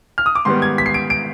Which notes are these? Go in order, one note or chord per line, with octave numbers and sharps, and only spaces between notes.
F6
D#6
D6
G#2 D#3 G3 B3 C6
G#6
B6
C7
D7
D7